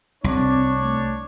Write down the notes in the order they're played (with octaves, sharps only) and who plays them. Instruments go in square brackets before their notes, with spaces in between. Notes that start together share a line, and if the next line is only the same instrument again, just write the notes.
[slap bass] C2 [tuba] C4 [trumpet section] D4 C#5
[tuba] A3